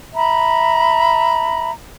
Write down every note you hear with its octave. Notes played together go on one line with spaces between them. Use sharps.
E5 A#5 B5